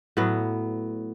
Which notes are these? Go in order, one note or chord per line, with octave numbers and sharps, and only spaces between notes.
A2 F#3 B3